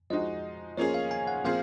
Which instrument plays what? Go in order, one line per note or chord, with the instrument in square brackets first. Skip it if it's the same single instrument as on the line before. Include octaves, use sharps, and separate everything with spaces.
[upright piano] F3 G#3 D#4 F#4 [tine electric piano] D#5
[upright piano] F3 A#3 C#4 F4 G#4 [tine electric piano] C#5
[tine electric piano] F5
G#5
F#5
[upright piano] A#2 F3 C4 F4 G#4 [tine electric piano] F5